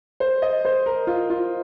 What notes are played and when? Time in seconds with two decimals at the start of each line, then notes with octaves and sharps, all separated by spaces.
0.20 C5
0.42 D#5
0.65 C5
0.86 A#4
1.07 F4
1.30 F4